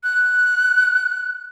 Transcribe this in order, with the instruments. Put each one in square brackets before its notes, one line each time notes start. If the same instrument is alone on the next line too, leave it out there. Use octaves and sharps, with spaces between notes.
[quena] F#6